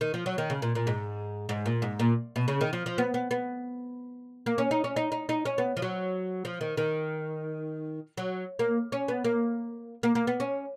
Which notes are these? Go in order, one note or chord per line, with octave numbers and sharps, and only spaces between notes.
D#3
F3
F#3
D#3
C#3
A#2
A#2
G#2
G#2
A#2
G#2
A#2
B2
C#3
D#3
F3
F3
B3
B3
B3
A#3
C#4
D#4
C#4
D#4
D#4
D#4
C#4
B3
F3
F#3
F3
D#3
D#3
F#3
A#3
C#4
B3
A#3
A#3
A#3
B3
C#4